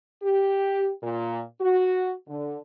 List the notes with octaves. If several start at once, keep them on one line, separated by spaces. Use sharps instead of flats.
G4
A#2
F#4
D3